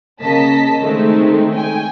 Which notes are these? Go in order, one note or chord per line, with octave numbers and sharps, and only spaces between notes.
C#3 A#3 D#5 A5 B6
D#3 G#3 A3 C4 D#4
G5 G#5